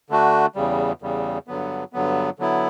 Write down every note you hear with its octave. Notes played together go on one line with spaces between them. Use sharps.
D3 A3 D4 F#4
E2 C#3 G3
E2 C#3 G3
G2 D3 F#3 B3
G2 D3 F#3 B3
D3 F#3 B3 E4